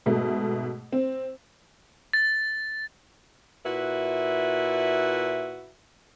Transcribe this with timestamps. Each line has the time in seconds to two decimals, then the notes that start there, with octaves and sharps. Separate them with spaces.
0.06 G#2 B2 A3
0.92 C4
2.13 A6
3.65 A#2 E4 F#4 B4 E5